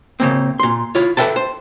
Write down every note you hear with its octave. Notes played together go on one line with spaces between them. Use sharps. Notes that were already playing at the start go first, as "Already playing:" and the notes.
C#3 A#3 C4
A#2 C6
E4 F4 C#5
A4 B4 D#5 E5 G5 A5
C5